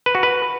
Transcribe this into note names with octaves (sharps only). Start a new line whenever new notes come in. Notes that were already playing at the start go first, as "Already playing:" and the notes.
B4
F#4
B4